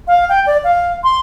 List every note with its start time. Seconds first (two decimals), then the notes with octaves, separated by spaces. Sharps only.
0.08 F5
0.29 G5
0.47 D5
0.64 F5
1.04 C6